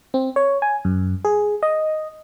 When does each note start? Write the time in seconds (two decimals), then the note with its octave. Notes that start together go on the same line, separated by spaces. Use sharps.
0.14 C4
0.36 C#5
0.62 G#5
0.85 F#2
1.25 G#4
1.63 D#5